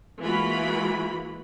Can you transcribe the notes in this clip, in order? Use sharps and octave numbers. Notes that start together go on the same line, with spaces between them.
E3 G#3 A#3 F4 F#4 B5